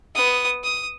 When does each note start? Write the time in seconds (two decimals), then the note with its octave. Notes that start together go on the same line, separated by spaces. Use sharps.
0.15 B3 D#6
0.64 D#6